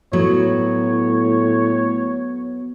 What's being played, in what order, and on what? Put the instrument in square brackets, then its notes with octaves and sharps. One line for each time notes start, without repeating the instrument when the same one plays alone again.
[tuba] A2 [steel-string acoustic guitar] F#3 B3 [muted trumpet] C#5